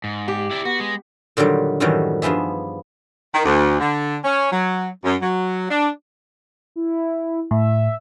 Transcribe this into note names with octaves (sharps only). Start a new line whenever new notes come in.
G#2
G4
E4 D5
B3 F#4
G#3
A#2 D3 D#3 F#3 G3
F#2 A2 D#3 E3 F#3 G3
G2 F3 B3 G#4 E5
D#3
D2
D3
C#4
F#3
F#2
F#3
D4
E4
A2 E5